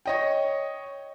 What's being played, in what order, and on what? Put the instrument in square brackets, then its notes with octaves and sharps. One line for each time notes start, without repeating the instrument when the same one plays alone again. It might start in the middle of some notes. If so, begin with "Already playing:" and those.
[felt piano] C#5 D#5 G5